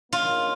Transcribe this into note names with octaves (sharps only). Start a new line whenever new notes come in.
C#3 A#3 D#4 F4 A#4 C#5